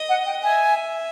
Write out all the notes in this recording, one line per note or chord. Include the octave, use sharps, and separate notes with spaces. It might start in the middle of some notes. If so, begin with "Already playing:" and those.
Already playing: D#5
F#5
G5
E5 G#5